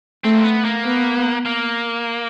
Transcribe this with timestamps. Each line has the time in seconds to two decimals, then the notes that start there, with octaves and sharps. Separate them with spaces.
0.24 A3 C4
0.35 A#3
0.44 B3
0.65 A#3
0.85 B3
1.46 A#3